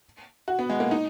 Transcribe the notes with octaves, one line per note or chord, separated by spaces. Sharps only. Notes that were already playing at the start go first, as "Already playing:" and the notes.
F#4
B3
G#3
A#3
D#4